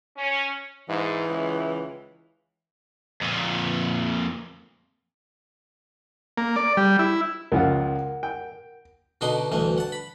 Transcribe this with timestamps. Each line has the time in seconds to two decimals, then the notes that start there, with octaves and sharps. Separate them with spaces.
0.17 C#4
0.89 G#2 E3
1.29 C#2
3.21 F2 A#2
6.38 A#3
6.56 D5
6.77 G3
6.99 E4
7.52 C#2 F3 F4 A#4 F#5
8.23 G5
9.21 B2 D3 D#4 F#5 C6 D6
9.52 D2 G2 E3 A3
9.78 F#5 A5
9.92 B5